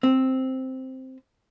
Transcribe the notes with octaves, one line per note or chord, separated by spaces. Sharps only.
C4